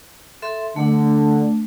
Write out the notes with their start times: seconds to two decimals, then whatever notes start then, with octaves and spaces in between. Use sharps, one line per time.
0.42 A4 E5 C6
0.76 D3 A3 D4